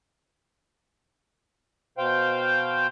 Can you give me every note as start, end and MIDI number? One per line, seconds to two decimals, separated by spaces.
1.98 2.87 47
1.98 2.87 72
1.98 2.87 77
1.98 2.87 79